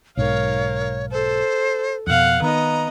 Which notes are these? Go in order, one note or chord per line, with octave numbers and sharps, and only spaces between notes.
B1 G#2 A#4 C#5 F5
A4 C5
F2 B2 F5 F#5
D#3 B3 D#5 A#5